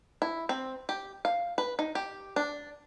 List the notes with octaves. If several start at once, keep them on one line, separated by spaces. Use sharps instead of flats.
E4
C4
G4
F5
B4
D#4
G4
D4